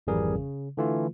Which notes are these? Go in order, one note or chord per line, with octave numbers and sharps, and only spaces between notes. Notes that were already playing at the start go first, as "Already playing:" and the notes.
G#1 F2 E3 G3 G#4 A#4
C#3
D3 E3 A3 F4